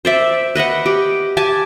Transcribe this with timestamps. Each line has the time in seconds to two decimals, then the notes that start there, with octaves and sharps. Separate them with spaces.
0.05 C5 D5 E5
0.55 B4 D#5 E5 F#5
0.86 G4
1.37 G4 G#5 A5